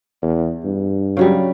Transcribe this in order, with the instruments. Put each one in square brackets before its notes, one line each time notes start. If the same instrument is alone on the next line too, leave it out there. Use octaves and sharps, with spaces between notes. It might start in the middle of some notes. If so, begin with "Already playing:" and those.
[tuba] E2
G2
[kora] C#3 F#3 G3